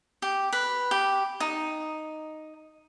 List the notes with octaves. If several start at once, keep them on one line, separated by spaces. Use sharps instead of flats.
G4
B4
G4
D#4